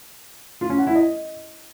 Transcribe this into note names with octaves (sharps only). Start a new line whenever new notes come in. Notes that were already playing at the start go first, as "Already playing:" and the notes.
F4
C#4
F#5
E4
D#5